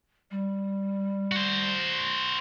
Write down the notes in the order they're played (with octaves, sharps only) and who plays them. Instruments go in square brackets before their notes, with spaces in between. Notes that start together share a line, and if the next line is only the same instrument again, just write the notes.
[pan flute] G3
[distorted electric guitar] F#4 C5